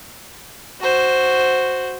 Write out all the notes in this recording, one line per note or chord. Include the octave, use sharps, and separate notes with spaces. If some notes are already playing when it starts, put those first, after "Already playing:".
F#4 C5